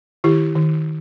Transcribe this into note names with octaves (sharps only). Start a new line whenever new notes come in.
D#3 E4 G4
D#3